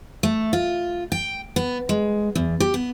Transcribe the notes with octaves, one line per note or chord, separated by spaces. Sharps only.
A3
F4
G5
B3
G#3
E2
G4
B3